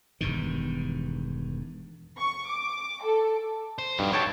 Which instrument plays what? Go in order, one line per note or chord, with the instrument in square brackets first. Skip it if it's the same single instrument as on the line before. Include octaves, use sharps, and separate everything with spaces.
[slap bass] E1 G2 D#3
[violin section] C#6
D6
A4
[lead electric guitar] C5
[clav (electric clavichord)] G2 [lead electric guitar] D#4 F#4
[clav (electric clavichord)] C#5 G5 A5